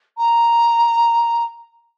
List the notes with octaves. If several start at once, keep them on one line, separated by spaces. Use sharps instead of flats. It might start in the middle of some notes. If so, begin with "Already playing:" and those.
A#5